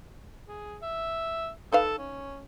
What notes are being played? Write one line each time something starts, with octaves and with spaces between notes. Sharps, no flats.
G#4
E5
D#4 A4 B4 F5
C#4